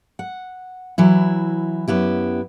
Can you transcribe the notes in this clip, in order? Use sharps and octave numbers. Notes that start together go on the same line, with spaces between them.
F#5
E3 F#3 E4
F#2 B3 E4 G4